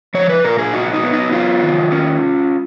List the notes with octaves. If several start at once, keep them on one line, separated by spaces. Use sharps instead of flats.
F3 C#5
B4
A#2 A#4
G#4
D#4 F#4
D#4
B3
D#4
F#3 F4
D#3
C#4